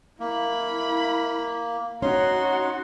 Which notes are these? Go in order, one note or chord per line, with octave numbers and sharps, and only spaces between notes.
A#3 E4 B5
C#4 D#4 F#4 C6